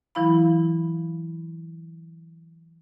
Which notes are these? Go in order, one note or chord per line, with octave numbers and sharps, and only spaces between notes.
E3 F#3 E4 F5 B5